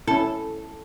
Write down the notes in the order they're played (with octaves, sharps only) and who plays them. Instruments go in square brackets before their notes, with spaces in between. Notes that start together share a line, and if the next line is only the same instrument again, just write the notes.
[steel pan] C#4 E4 [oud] A4